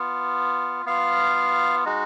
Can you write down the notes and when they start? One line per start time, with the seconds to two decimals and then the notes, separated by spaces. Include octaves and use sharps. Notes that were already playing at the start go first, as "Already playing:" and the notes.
Already playing: B3 F4
0.86 B3 F4 F5
1.85 G#3 D#4 F#4